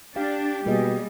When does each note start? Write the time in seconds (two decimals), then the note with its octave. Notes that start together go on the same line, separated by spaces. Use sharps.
0.16 D4 G4 F5
0.66 B2 G3 A#3 G#4 D#5